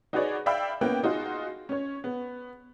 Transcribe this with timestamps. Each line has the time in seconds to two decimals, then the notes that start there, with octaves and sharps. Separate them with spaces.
0.13 D#4 F#4 G#4 B4 C#5 D5
0.46 D5 E5 F5 G5 B5 E6
0.81 A#3 B3 C#4 E4 B4 G5
1.04 D#4 F4 F#4 G#4
1.69 C#4 C#5
2.04 B3